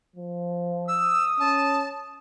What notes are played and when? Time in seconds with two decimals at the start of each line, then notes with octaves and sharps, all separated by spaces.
0.16 F3
0.88 D#6 E6
1.40 C#4 A5